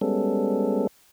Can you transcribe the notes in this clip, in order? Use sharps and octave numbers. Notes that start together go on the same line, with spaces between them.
G3 G#3 B3 C#4 A4